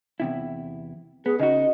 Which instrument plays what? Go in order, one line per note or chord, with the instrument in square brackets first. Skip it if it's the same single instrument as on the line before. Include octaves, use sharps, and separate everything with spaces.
[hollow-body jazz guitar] E2 C3 E4
[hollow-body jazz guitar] B3 [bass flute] G#4
[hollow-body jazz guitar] C#3 D#4 F#4 [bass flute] D#5